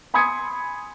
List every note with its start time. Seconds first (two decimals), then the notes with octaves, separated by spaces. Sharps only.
0.14 G#5 B5 C6 D#6 G#6 C#7